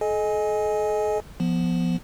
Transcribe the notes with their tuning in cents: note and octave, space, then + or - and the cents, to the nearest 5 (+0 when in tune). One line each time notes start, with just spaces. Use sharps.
A4 -45 D#5 +0 G#5 +0
F3 +0 B3 +0